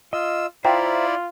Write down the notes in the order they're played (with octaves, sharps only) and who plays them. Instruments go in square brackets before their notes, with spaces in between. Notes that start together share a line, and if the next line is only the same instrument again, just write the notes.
[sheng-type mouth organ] F4 E6 [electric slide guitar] D#5
[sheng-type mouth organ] E4 D5 [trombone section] F4 [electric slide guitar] C5 E5 A#5 [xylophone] G5